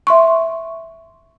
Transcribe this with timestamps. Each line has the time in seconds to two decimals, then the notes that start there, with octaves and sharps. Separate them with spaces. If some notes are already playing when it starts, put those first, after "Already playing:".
0.07 E5 C6 C#6